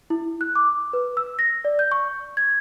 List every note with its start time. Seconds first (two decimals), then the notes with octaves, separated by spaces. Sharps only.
0.10 E4
0.41 F#6
0.56 D6
0.93 B4
1.17 E6
1.39 A#6
1.65 D5
1.79 G6
1.92 C#6
2.37 G#6